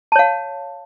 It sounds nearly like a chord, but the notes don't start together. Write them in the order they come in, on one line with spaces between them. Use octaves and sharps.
A5 C#5 F5